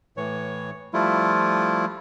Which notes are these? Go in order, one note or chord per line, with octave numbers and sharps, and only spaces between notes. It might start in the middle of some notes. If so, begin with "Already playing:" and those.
A2 E3 C#5
F3 G3 A3 E4 F4